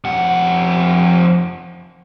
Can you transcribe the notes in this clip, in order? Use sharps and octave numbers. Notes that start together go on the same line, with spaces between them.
F2 F#5